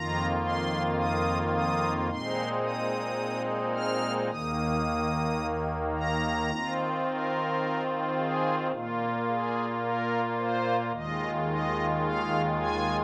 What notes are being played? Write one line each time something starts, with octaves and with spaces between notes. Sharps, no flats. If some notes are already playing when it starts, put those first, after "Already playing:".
Already playing: F2 D#3 A#3 F4 A#5
C6
D#6
D#6
A#2 G#3 C4 D#4 C6
D#6
F6
D#2 D#3 A#3 D#6
A#5
D#3 C4 F4
A#4
G#4
A#2 A#3 F4
G#4
A#4
C5
D#2 D#3 G#3 F4 D#5
D#5
F5
G#5